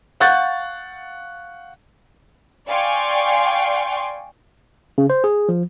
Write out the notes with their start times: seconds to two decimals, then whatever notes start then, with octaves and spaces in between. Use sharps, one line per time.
0.20 F5 F#5 C#6 F#6 G6 A6
2.69 D5 F5 G5 G#5 C6 C#6
4.98 C#3
5.10 C5
5.24 G#4
5.49 F3